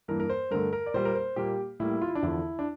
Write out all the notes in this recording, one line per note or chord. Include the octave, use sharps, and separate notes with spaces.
G2 E3 A#3 A#4
A#4
C5
G2 D3 A3 A#4
A#4
D5
A#2 G3 A#3 C5
A#4
C5
A#2 G3 A#3 G4
A2 G3 A#3 E4
F4
E4
D4
E2 D3 F3 E4
D4